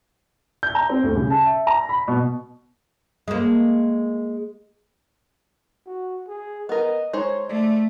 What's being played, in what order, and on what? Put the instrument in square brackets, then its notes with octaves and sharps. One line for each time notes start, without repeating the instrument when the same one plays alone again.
[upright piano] G6
A#5
C4
D2
C#3
A5
E5
A#5
B5
B2
[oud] G#3 A#3
[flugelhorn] F#4
G#4
[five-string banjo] B3 A#4 [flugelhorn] D#5
[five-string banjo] G#3 D#4 C5 [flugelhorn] C#5
[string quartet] A3 [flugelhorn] D5